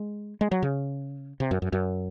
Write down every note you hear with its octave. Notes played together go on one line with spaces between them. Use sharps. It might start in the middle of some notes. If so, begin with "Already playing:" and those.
Already playing: G#3
G#3
F#3
C#3
C3
F#2
F#2
F#2